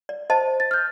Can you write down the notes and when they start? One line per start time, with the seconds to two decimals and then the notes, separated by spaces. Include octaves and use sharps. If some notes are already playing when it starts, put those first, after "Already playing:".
0.09 D5
0.30 C5 D#5 A5
0.60 A6
0.71 F6 G6